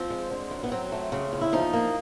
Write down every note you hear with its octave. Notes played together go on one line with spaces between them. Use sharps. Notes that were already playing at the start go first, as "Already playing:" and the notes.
Already playing: F3 C4
G#3
D3
F#2
B3
F#3 C4
A3
C#3
E2
E4
F3 D#4
A#3